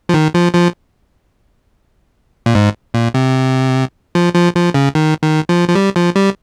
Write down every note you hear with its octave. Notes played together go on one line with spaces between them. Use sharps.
F3
D#3
F3
F3
A#2
G#2
A#2
C3
F3
F3
F3
C#3
D#3
D#3
F3
F3
G3
F3
G3